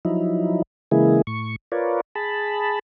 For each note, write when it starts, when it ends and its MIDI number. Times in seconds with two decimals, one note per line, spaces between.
0.05 0.62 53
0.05 0.62 54
0.05 0.62 63
0.05 0.62 64
0.91 1.22 49
0.91 1.22 52
0.91 1.22 56
0.91 1.22 58
0.91 1.22 64
0.91 1.22 68
1.27 1.56 45
1.27 1.56 85
1.72 2.01 65
1.72 2.01 70
1.72 2.01 71
1.72 2.01 73
1.72 2.01 74
2.15 2.79 68
2.15 2.79 81
2.15 2.79 83